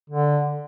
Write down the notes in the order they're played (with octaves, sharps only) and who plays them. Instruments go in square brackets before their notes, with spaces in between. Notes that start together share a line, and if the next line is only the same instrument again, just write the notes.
[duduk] D3